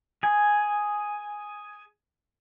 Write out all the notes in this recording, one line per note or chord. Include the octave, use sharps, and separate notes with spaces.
G#4 G#5